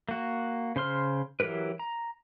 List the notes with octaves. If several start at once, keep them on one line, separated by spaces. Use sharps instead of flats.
A#3 F#4
C#3 C5 C6 F6
E3 F#3 G4 A#4 B4
A#5